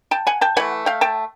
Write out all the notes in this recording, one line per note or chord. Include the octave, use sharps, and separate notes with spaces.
G5 A5
F#5 G#5
G5 A5
E3 A3 F#5 G#5
F5 G5
G5 A5